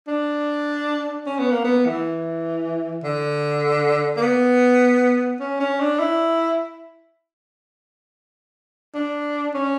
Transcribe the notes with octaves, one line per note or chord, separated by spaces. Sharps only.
D4
C#4
B3
A#3
B3
E3
D3
A#3
B3
C#4
C#4
D4
E4
D4
C#4